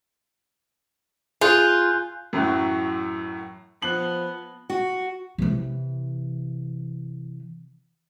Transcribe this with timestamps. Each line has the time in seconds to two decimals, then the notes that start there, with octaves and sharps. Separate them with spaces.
1.41 F4 G#4 G#5 F#6 G6
2.33 F#2 A2 E3 F#3
3.82 F3 B3 A5 F#6 F#7
4.70 F#4
5.38 C3 E3